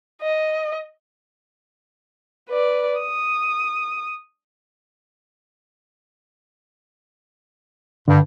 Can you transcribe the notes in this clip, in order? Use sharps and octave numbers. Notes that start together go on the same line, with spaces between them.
D#5
B4 D5
D#6
G2 D3